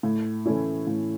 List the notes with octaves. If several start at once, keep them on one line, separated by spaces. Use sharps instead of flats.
A2
E3 A3 C#4 E4
A2